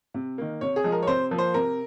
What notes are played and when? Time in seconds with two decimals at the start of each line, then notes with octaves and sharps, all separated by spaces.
0.14 C3
0.38 D#3 A#3
0.61 C3 C#5
0.76 G#4
0.84 F3 G#3
0.92 A#4
1.03 C#5
1.07 C3 C5
1.31 F3 A#3
1.38 C5
1.54 C3 A#4